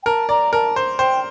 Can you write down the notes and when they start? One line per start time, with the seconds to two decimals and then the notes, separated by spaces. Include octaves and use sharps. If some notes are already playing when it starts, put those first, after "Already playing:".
0.03 G5
0.06 A#4 A5
0.29 D5 A#5
0.53 A#4 A5
0.76 C5
0.99 C5 G5